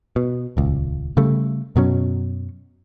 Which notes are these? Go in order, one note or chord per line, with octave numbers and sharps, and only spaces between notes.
B2
D#1 C#2
C#3 G3 A3
F#2 B2 F#3 C#4